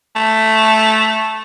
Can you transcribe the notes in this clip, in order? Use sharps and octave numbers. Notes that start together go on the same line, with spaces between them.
A3